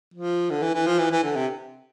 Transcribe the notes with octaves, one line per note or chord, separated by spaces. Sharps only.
F3
D3
E3
E3
F3
E3
E3
D3
C3